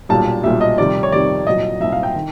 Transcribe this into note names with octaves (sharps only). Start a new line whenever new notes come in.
B1 A#2 G3 A5
B1 A#2 G3 E5
D#5
F2 C3 D#3 G3 D5
C#5
F2 C3 D#3 G3 D5
C2 A#2 F#3 D#5
C2 A#2 F#3 E5
F5
G5
D#3